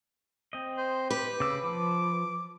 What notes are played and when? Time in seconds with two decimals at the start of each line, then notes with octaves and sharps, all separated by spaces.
0.53 C4 D#5
0.78 C5
1.10 G4 B4
1.40 C#3 D6 E6
1.64 F3 D6